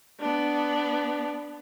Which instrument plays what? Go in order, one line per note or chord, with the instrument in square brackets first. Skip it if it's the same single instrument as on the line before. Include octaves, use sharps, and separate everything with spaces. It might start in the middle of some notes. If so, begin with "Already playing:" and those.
[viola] B3 D4